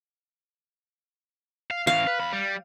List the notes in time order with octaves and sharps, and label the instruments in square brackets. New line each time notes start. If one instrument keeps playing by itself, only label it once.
[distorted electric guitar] F5
[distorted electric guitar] E3 C#4 [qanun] F5
[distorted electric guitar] B4
E2 B5
G3